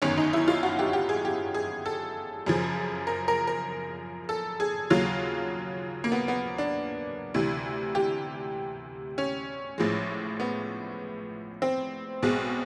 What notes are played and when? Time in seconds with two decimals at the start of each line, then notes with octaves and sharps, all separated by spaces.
0.02 G1 F#2 D#3 C#4
0.18 D#4
0.33 E4
0.48 F4
0.63 F#4
0.79 G4
0.93 G4
1.09 G#4
1.25 G4
1.54 G#4
1.86 A4
2.46 F#2 C#3 F3
3.07 A#4
3.28 A#4
3.47 A#4
4.29 A4
4.60 G#4
4.90 D#2 C#3 F#3 F4
6.04 A#3
6.12 B3
6.28 B3
6.58 D4
7.34 D2 C3 E3
7.95 G4
9.18 C#4
9.78 A1 A2 F3 G#3
10.40 B3
11.62 C4
12.23 B1 B2 G#3